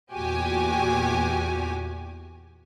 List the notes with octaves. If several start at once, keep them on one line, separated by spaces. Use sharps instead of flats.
E2 A#2 F#4 G4 G#5